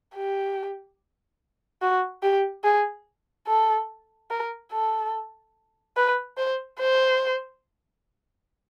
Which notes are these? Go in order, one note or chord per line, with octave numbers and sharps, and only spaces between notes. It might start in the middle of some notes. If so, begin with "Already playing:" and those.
G4
F#4
G4
G#4
A4
A#4
A4
B4
C5
C5